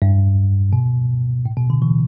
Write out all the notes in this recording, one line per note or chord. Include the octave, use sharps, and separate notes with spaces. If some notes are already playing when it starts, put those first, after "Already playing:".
G2
B2
A2
B2
D3
E3